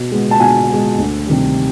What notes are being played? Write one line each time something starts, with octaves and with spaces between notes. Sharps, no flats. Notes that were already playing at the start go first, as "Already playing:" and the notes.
Already playing: B2
G#3 B3
A5
B2 G#5
G#3 B3
D2
C3 D#3 G3